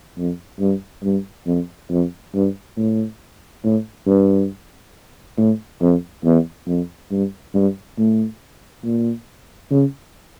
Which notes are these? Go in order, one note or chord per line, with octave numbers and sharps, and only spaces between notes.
F2
G2
G2
F2
F2
G2
A2
A2
G2
A2
F2
E2
F2
G2
G2
A2
A#2
C#3